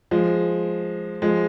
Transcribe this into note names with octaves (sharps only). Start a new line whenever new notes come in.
F3 G#3
F3 G#3